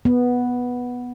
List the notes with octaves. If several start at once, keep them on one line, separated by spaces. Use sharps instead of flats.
B3